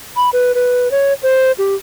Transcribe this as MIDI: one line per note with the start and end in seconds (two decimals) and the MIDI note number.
0.16 0.29 83
0.33 0.52 71
0.55 0.91 71
0.91 1.13 73
1.23 1.52 72
1.58 1.75 67